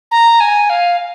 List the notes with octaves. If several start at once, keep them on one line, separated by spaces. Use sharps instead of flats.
A#5
G#5
F5